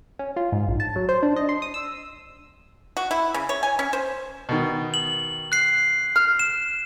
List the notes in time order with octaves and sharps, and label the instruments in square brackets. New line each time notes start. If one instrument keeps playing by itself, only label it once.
[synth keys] C#4
F4
G#2
A#1
A5
F#3
C5
D4
D#5
C6
D#6
E6
[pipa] F#4
E4
C#3
C#5
G#5
C#4
C5
[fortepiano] B2 D#3
[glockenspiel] F#7
F#6 C7
[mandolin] F6
[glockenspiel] E7